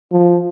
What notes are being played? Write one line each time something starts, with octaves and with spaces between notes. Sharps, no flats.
F3